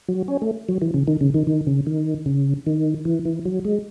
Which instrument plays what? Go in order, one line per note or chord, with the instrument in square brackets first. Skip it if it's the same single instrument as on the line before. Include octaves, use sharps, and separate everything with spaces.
[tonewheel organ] F#3
C#4
A3
F#3
E3
C#3
D#3
C#3
D#3
D#3
C#3
D#3
C#3
D#3
E3
E3
F#3
G#3